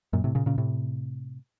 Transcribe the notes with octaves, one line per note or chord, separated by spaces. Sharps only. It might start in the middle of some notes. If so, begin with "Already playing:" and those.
F#2 A#2
A2 C3
A#2 C#3
A#2 C#3
A2 C3